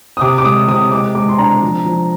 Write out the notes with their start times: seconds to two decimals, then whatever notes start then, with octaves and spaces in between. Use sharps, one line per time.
0.17 D#6
0.21 C3 D6
0.38 D6
0.45 G#3 D#6
0.68 C3 D#6
0.91 G#3 D6
1.15 G#3 D6
1.29 C6
1.38 D4 A#5
1.62 F3
1.85 F3